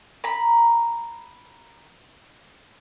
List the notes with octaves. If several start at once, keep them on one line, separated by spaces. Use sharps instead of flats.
A#5 B5